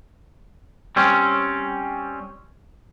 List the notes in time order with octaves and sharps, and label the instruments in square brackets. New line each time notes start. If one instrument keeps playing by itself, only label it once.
[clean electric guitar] G3 C4 C#4